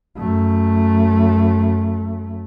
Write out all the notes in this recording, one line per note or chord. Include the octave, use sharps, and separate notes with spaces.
F#2 A3